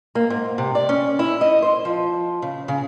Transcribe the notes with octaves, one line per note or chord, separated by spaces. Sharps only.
A#3
G#2
C3
D5
C#4
E4
D#5
C5
F3
C#3
C#3